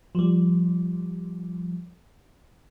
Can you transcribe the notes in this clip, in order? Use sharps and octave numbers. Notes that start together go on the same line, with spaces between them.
F3 G3